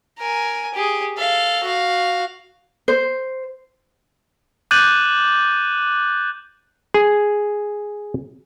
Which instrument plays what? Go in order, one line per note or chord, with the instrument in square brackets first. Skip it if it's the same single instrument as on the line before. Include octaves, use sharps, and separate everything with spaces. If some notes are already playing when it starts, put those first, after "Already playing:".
[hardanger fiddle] A#4 G#5
G4 G#4
A4 F5
F#4 F5
[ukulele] C5
[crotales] D6 F#6 G6 A6 D#7 F#7
[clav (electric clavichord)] G#4